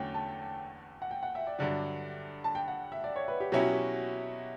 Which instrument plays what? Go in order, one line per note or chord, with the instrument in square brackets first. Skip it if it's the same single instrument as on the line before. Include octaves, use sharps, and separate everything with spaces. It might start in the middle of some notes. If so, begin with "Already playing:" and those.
Already playing: [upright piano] E2 D3 F#3 A3 C#4 [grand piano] G5
[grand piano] A5
F#5
G5
F#5
E5
D5
[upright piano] G2 D3 F#3 [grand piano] D5
[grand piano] A5
G5
F#5
E5
D5
C#5
B4
G4
[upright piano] B2 F#3 C#4 E4 [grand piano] G4
[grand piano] F#4
G4